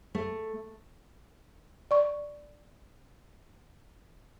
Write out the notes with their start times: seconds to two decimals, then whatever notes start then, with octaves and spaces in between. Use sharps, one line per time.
0.15 A3
1.91 D5 C#6